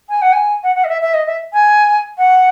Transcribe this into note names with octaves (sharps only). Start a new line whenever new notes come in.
G#5
F#5
G#5
F#5
F#5
D#5
E5
E5
D#5
E5
G#5
F#5